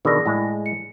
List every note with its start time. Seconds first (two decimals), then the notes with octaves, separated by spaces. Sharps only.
0.05 B2 D3 D#3 G#4 D5 A#6
0.26 A2 G#3
0.66 C#7